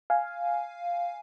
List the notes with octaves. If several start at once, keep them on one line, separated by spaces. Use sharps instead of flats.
F5 G#5